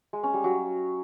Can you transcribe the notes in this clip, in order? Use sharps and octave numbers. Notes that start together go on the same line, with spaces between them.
G#3
C#4
G3
F#3